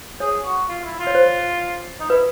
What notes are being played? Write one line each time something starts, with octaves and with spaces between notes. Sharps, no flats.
G#4 C#5
F#4
F4
E4
F4
C#5
C5
D#4
E4 B4